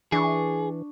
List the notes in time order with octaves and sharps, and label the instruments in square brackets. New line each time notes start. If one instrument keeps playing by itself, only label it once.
[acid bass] E3 [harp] D4 C#6 [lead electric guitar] G#4